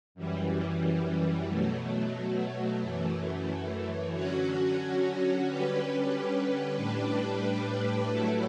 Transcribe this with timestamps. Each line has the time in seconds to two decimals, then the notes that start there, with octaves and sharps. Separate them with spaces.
0.15 F#2 E3 G3
1.47 B2 F#3 A3
2.79 F#2 E3 A3
4.12 D3 F#3 C#4 F#4
5.44 D3 G3 C#4 G4 B4
6.76 A2 G3 D4 G4 B4
8.09 A2 F#3 A3 E4 A4